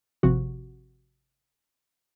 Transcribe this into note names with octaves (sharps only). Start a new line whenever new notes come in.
G#1 C3 F3 F#4